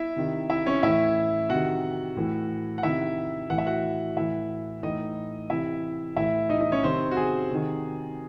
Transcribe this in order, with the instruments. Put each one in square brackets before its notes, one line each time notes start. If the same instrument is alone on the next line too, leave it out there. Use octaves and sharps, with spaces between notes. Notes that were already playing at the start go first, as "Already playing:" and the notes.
Already playing: [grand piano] E4 E5
C3 D#3
E4 E5
C#4 C#5
A2 E3 E4 E5
C3 D#3 F#4 F#5
A2 E3
F#5
C3 D#3 E4 E5
A2 E3 F#5
E5
F#4 F#5
A2 E3 E4 E5
A2 E3 D#4 D#5
C3 E3 E4 E5
A2 E3 E4 E5
D#4 D#5
D#4 D#5
C#4 C#5
C3 D#3 C4 C5
F#4
G#4
C3 D#3